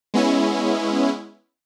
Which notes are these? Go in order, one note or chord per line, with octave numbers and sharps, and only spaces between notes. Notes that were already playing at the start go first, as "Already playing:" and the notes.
G#3 B3 C#4 E4